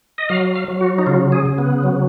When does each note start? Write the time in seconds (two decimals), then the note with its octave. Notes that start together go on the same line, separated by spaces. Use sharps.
0.18 D#5
0.29 F#3 F5
0.55 F5
0.68 F#3
0.81 F#4
0.98 D#4
1.06 C#3 F4
1.32 G#4
1.46 C#3
1.58 B3
1.84 F#3